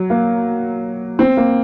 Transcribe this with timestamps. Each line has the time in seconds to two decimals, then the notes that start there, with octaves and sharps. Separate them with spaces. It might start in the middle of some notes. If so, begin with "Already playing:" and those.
Already playing: F#3
0.10 A#3
1.19 C4
1.37 A#3